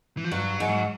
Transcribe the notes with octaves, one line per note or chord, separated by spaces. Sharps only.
E3
F3
G2 F#3
G#2